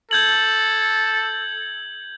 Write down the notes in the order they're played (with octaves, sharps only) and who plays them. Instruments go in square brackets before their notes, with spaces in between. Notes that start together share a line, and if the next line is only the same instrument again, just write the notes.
[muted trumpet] A4 [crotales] G6 G#6 F#7